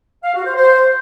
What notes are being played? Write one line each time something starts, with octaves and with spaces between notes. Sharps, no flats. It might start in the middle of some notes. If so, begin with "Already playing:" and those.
F5
F#4
C5
C5